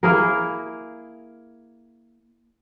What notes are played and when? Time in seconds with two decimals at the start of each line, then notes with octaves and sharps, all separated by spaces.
0.03 A#3 E4 G#4 A#4